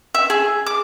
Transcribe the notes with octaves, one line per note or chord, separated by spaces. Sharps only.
E5
G#4
D6